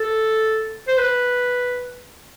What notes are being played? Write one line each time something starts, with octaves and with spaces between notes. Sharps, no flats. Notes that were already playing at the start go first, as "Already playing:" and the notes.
Already playing: A4
C5
B4